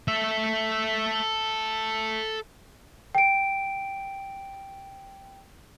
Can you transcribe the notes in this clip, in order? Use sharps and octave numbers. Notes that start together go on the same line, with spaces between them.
A4 E5
G5 D7